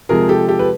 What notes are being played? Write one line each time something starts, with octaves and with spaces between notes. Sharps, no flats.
C3 F3 G#3 G#4 A#4
G4 A4
G4 A4
B4